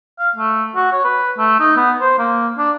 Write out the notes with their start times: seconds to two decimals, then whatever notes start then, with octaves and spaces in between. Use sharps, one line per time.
0.19 F5
0.36 A3
0.76 F#4
0.92 C#5
1.05 B4
1.38 A3
1.60 D#4
1.76 B3
2.01 C5
2.18 A#3
2.58 D4